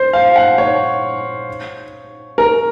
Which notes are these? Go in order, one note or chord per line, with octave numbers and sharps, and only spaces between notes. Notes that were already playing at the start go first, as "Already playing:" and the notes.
Already playing: C5
F5
F#5
C#5
A#4